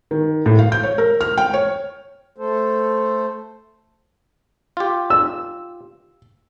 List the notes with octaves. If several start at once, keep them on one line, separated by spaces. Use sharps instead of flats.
D#3
A2
F5
G6
C#5
A#4
F6
G5
C#5
A3 A4 C5
F4 G4
E6